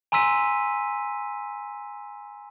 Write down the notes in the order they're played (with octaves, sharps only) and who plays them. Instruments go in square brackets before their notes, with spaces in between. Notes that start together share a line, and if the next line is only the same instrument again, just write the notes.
[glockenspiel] G#5 A#5 C6 E6 B6 D#7